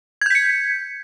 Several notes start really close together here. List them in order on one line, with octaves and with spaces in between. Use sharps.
G#6 G6 B6 C#7